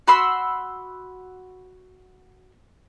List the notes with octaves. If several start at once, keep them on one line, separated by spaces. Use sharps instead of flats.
F#4 B5 C6 E6